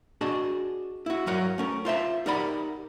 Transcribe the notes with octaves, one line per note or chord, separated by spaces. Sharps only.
D4 F#4 G#4 D#5 A5
E4 F#4
G2 F#3 A#4 F#5
A3 C#4 A#4
F4 C5 E5 A5
D#4 G4 A#4 D5 F#5 B5